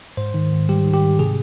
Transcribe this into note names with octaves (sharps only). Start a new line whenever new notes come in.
G#2 C5
D#3
G#2
G3 G4
D#3
G4
G#2
C3 G#4